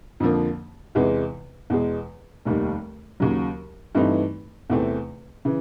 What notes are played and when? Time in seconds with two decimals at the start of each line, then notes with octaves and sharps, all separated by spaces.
0.20 F2 D3 F3 A#3
0.95 E2 C3 E3 G#3 B3
1.70 E2 B2 G#3
2.45 F1 D#2 D#3 G3
3.20 D#2 C#3 F#3
3.95 G2 E3 A3 C4 D#4
4.70 E2 C3 E3 A3 C4
5.45 C#3 E3